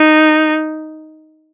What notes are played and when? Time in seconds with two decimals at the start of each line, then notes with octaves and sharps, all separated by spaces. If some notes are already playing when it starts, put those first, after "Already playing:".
Already playing: D#4